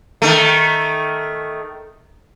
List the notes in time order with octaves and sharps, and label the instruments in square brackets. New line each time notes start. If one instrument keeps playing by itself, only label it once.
[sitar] D#3 A3